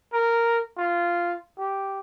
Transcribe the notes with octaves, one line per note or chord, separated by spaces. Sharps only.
A#4
F4
G4